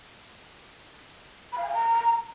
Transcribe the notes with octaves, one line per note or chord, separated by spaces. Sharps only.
B5
F5
G#5
F5
A#5